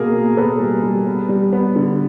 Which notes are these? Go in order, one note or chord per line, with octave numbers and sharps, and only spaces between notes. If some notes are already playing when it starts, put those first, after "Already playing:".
Already playing: B2 A#3 G#4 A#4
A#3
B2 A4 B4
G3
G3
B3
G3
B3
D3